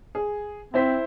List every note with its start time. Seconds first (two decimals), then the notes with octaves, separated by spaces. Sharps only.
0.15 G#4
0.74 C4 E4 C5 B6